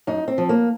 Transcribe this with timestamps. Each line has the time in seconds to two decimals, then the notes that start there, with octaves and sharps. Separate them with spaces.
0.07 F#2 D#4
0.28 C4
0.38 F3
0.49 A#3